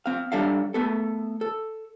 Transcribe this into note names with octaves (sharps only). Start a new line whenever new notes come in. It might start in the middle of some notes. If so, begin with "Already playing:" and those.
C4 F5
G3 D4 A4 E5 F5
A3 B3 A4
A4